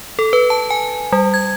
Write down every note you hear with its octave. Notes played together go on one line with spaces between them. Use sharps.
A4
B4
A5
G#5
G3
G#6